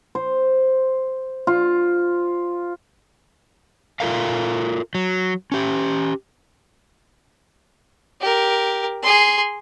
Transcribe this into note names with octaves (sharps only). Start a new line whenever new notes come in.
C5
F4
F4 F#4 A4 A#4 E5 F5
F#3
C#4 G4
G4 A#4
G#4 C6